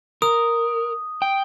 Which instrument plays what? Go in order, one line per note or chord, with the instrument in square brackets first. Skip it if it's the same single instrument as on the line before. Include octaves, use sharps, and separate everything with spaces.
[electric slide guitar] A#4 [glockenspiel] D#6
[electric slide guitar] G5